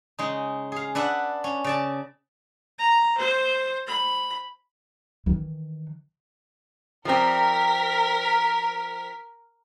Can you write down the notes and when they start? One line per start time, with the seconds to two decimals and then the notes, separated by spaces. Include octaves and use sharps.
0.19 C#3 G#3 D#4
0.72 G#4 F5
0.95 D4 B4 E5 F#5
1.44 C#4
1.64 C#3 D5 A5
2.78 A#5
3.18 C5
3.87 B5
5.26 D#3 E3
7.05 F3 G3 C4 A#4 B6